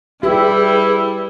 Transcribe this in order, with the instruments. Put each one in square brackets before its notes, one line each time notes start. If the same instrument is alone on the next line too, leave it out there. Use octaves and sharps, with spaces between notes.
[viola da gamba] G3 [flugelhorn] E4 [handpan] G4 [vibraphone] G#4 B4 E6